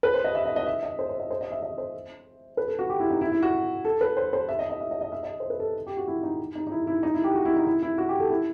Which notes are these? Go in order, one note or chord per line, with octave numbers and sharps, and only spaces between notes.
B4
C5
D#5
E5
D#5
D#5
E5
D#5
C5
C5
D#5
C5
D#5
E5
D#5
C5
B4
A4
F#4
G4
E4
D#4
E4
E4
F#4
A4
B4
C5
C5
E5
D#5
D#5
E5
D#5
D#5
E5
D#5
C5
B4
A4
G4
F#4
E4
D#4
D#4
D#4
E4
E4
D#4
E4
G4
F#4
E4
D#4
E4
E4
F#4
G4
A4
E4